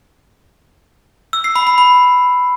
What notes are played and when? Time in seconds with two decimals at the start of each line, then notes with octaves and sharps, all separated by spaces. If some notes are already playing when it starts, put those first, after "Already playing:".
1.33 E6
1.44 C7
1.56 B5
1.67 B5
1.78 B5